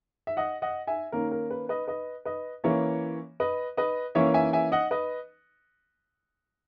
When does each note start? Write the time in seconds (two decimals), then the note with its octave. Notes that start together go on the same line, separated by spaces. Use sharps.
0.27 E5
0.37 D#5 F#5
0.62 D#5 F#5
0.87 E5 G#5
1.12 D#3 A#3 C#4 A#4
1.31 A#4
1.51 B4
1.69 B4 D#5
1.88 B4 D#5
2.25 B4 D#5
2.64 E3 A#3 C#4 C#5 E5
3.40 B4 D#5
3.77 B4 D#5
4.15 E3 A#3 C#4 C#5 E5
4.34 E5 G#5
4.53 E5 G#5
4.72 D#5 F#5
4.91 B4 D#5